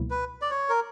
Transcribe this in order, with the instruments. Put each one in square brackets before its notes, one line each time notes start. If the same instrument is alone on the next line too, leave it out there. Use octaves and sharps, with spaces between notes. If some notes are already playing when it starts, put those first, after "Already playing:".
Already playing: [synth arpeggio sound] C#2 B2 F#3 A#3 E4
[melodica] B4
D5
C#5
A#4